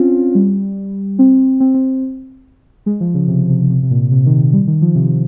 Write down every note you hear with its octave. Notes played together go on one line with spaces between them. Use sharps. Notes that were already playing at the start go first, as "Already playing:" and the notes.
Already playing: C4 C#4 F4
G3
C4
C4
C4
G#3
F3
C#3
C3
C3
C3
C3
A#2
C3
D#3
G3
D#3
F3
C3